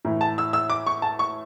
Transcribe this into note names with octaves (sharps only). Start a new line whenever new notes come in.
A2 E3
A5
E6
E6
D6
C#6
A5
C#6